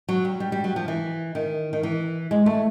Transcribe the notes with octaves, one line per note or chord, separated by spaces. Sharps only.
F#3
G3
G3
G3
F#3
F3
E3
D#3
D#3
E3
G#3
A3